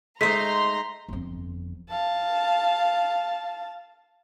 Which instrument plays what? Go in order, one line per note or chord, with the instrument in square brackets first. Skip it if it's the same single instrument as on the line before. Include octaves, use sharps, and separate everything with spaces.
[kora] G#3 D#4 [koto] A3 C5 [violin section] A#5 C6 [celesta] B6
[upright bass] G1 F2
[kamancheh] F5 A5